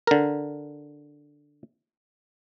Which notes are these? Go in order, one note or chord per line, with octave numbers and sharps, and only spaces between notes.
D3 A#4